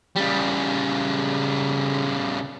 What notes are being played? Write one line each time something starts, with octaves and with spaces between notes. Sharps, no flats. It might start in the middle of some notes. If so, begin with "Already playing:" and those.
C#3 G3